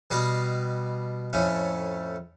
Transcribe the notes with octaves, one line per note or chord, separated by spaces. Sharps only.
B2 G3 D5 D#5 F5
F2 A2 A3 C#4